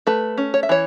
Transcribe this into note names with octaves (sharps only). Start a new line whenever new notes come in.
A3 B4
C#4
C#5
E5
E3 C#5